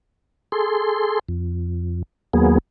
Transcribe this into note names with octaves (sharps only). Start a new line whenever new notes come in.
G#4 A4 C6
F2
D#2 F#3 A#3 B3 G#4